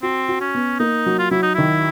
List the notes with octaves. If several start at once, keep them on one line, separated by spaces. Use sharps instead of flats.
C4 F#4
F#4
C#4
B3
A#3 D#4
F#3
F4
F#3 E4
D#4
D#3 E4